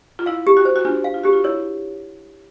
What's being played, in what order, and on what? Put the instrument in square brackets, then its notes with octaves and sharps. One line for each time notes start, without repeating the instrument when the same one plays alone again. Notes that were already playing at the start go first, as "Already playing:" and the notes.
[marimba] F4
[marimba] E4 [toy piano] F5
[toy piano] G4
[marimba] F#4
[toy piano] C5
[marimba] F#4
[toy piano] D4 [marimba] F4
[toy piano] F5
[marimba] F4
[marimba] F#4 [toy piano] G4
[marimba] F4
[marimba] E4 [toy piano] C#5